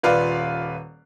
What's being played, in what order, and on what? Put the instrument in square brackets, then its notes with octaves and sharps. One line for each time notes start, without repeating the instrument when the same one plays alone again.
[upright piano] D#1 F4 B4 D5 F5